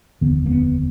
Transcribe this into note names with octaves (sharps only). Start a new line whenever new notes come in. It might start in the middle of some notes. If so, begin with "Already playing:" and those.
F1 D#2 D3 B3
A#3
B3